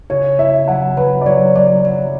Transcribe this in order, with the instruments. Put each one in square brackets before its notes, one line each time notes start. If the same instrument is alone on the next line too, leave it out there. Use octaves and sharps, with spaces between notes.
[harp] C#3 [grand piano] C#5
[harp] E4 [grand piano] E5
[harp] F#3 [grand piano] F#5
[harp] F#3 [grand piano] B4
[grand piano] D5
[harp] F#3 [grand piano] C#5
[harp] F#3 [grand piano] D5
[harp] F#3